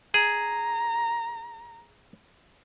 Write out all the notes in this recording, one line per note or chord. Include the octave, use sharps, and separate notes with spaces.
G#4 A#5